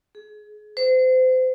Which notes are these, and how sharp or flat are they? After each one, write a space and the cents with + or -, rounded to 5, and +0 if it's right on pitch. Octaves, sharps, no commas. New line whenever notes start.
G#4 +30
C5 -30